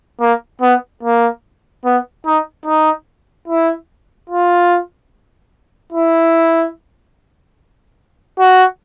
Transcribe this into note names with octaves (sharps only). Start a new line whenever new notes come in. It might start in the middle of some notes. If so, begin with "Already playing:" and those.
A#3
B3
A#3
B3
D#4
D#4
E4
F4
E4
F#4